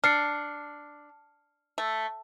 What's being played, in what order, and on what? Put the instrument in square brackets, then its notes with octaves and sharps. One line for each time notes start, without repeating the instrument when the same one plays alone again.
[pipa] D4 [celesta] F6 C7 C#7
[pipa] A3